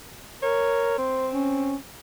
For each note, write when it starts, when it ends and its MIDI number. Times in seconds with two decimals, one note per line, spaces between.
0.43 0.97 70
0.43 0.93 73
0.98 1.78 60
0.98 1.28 72
1.34 1.75 61